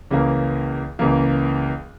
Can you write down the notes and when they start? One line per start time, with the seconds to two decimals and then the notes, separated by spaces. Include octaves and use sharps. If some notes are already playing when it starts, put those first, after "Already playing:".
0.11 C#2 C#3 E3 A#3
0.99 C#2 C#3 E3 A#3